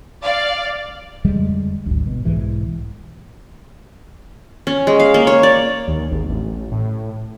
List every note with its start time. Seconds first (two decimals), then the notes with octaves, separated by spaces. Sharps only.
0.24 D5 F5
1.24 F2 D3 G3 G#3
1.86 G#1 D2
2.07 B2
2.25 B1 G#2 E3
4.67 C#4
4.87 G#3
5.00 F5
5.14 A#3
5.27 C#5
5.43 D5
5.88 D#2
6.11 G#1
6.30 A1
6.72 A2